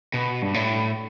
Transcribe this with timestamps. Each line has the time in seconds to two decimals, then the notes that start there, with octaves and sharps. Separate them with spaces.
0.14 B2
0.42 G2
0.54 A2